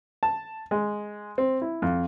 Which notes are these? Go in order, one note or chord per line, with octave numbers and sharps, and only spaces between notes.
A5
G#3
C4
E4
F2